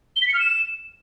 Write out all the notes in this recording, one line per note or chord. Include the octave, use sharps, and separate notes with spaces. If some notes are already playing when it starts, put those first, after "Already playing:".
G7
B6
C#7
F6
E7